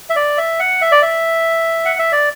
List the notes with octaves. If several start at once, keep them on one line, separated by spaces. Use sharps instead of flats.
E5
D5
E5
F#5
E5
D5
E5
F#5
E5
D5